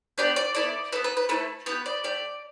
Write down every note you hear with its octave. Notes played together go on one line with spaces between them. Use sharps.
B3 D4 G4 D5
D5
B3 E4 A4 D5
B3 E4 A4 B4
B4
B4
A3 E4 A4 B4
B3 E4 G4 B4
D5
A3 G4 D5